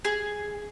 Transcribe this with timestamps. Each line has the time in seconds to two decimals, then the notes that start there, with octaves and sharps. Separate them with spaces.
0.05 G#4